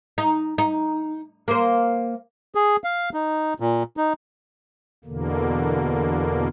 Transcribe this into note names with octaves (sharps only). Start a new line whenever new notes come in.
D#4
D#4
A#3 C5
G#4
F5
D#4
A#2
D#4
E2 B2 D3 A#3